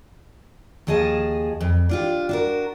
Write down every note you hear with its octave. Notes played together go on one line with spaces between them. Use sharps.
D#2 F3 G#4 D#5 A5
F2
D4 F4 G4
D4 F#4 A#4